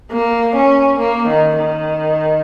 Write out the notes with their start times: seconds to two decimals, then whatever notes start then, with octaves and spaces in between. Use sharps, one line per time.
0.12 A#3
0.57 C#4
1.00 A#3
1.29 D#3
1.59 D#3